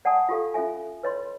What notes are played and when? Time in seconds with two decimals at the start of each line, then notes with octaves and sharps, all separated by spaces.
0.05 D5 F#5 G#5 A5 D#6
0.29 F4 G4 A4 F5
0.54 C#4 F4 A4 E5 G#5
1.03 B4 C#5 D#5 B5 C6